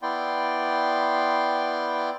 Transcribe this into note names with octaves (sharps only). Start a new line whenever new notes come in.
B3 E4 D5 G5 C6